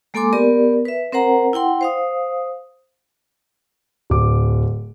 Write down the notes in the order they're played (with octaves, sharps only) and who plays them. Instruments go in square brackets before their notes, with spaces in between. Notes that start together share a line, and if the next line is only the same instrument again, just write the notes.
[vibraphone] G#3 A#3 A4 G#5 C6 D6
B3 G4 A#4 D5
B4 E5
C4 A#4 C5 F#5 A#5
E4 F#5 G5 C6
C5 F5 D#6
[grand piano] D1 D6